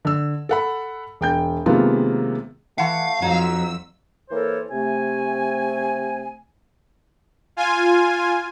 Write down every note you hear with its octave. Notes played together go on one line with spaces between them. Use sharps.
D3 E6
A4 F#5 B5
E1 G5 G6
C3 D#3 G#3 A#3 B3 F4
E3 A3 F5 F#5
F2 F#3 D#4 E6
E3 A#3 A4 A#4 C5 C#5
C3 A3 G#5
F4 G#5